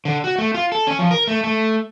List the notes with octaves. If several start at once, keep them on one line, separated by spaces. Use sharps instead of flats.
D3
F#4
A3
F4
A4
C#4
F3
A#4
A3
A3